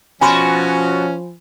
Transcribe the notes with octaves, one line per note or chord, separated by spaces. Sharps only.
B2 F3 C#4 F#4 G#5 B5 C6